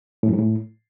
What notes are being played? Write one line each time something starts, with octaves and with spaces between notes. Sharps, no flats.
A2
F#2
G#2
A2